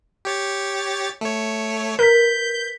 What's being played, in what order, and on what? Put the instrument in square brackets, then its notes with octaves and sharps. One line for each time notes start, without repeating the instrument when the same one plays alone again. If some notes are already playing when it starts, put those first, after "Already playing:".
[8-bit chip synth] G4 C#5 A6
A3 C#5
[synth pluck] A#4 [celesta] B4 B6 [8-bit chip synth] G6